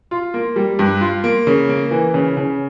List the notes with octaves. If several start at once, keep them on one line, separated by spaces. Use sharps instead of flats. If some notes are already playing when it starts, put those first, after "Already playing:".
F4
A#3
G3
G2
F4
A#3
C#3
A#3
E3
C#3
C#3